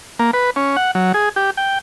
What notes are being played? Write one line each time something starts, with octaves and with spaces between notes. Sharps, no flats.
A#3
B4
C#4
F#5
F#3
G#4
G4
G5